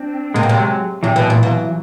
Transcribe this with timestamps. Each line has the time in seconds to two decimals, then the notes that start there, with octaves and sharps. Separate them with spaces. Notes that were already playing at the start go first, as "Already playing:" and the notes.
Already playing: C4 D4
0.34 C3 G#3 A#3
0.43 B2
0.49 C3
0.57 F#3 G#3
1.03 C3 E3 F#3
1.16 B2
1.30 A#2
1.43 B2